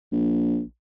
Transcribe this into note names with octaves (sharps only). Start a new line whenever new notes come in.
A#1